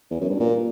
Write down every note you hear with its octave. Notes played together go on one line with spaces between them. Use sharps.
E2
F#2
G2
A#2